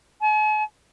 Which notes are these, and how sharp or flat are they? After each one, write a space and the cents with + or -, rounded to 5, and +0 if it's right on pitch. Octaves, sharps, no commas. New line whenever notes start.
G#5 +45